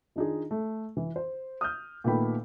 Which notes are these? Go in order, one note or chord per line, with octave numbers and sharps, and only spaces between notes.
D#3 D4 D#4 F4 G#4
A3
E3
C5
D#6 F6 G6
A#2 D#3 A3 B3 G5 B5